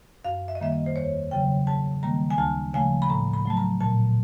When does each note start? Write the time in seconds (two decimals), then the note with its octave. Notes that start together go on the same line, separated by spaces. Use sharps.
0.25 F#2 F5
0.48 E5
0.55 D#5
0.60 D#3 G3 A#3 E5
0.72 D#5
0.86 C5
0.96 E2 C#5
1.31 C#3 F#3 G5
1.67 G#2 A5
2.03 D#3 G3 A#3 A#5
2.30 G#5
2.38 D2 A5
2.74 C#3 F3 A3 G#5
3.02 B5
3.10 A2 A#5
3.33 B5
3.45 F#3 A3 A5
3.57 A#5
3.81 A#2 A5